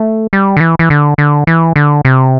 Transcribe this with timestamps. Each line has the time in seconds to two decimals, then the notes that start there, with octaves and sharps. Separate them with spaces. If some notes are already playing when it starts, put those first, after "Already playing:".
Already playing: A3
0.33 G3
0.57 D3
0.60 E3
0.79 E3
0.90 D3
1.18 D3
1.47 E3
1.76 D3
2.05 C3